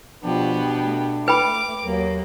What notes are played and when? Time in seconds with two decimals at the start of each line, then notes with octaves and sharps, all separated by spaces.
0.23 B2 F3 B3 D4 G4
0.83 A3
1.28 B4 G5 B5 D6
1.84 D#2 F#3 A#3